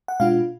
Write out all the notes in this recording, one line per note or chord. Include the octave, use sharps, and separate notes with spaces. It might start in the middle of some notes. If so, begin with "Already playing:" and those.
F#5
B2 G#3 D4 F4 F5